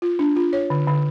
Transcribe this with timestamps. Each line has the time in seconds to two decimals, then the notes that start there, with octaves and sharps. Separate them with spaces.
0.02 F4
0.19 D4
0.36 F4
0.53 C#5
0.70 D3
0.87 D3